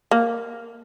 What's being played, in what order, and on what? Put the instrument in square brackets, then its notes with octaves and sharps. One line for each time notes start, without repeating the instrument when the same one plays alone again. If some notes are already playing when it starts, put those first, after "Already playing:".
[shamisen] A#3